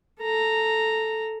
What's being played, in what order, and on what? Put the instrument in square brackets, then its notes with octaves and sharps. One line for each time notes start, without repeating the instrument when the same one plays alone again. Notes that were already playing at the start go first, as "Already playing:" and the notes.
[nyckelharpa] A4 A#5